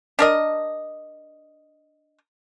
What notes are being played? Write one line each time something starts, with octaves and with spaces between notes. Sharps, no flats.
D4 A#4 D#5